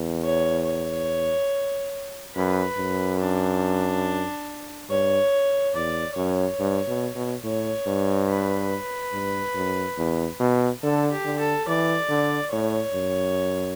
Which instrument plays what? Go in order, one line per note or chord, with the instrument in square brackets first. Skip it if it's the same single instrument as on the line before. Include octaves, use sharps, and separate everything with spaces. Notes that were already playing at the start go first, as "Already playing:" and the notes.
Already playing: [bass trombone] E2
[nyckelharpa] C#5
C#5
[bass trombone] F#2 [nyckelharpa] B4
[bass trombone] F#2
[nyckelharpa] D4
[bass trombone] G2 [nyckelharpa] C#5
[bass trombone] E2 [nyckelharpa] D5
[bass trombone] F#2 [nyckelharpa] C#5
[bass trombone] G2
B2
B2
[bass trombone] A2 [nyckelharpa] C#5
[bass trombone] G2
[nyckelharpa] B4
[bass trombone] G2
F#2
E2
B2
[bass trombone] D3 [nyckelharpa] A4
[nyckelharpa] G4
[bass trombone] D3
[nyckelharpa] A4
[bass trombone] E3 [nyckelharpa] D5
[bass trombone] D3
[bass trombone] A2 [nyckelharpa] C#5
[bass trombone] F#2